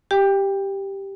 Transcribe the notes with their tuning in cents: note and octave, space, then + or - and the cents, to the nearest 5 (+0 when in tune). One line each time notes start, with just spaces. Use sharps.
G4 +0 G5 +20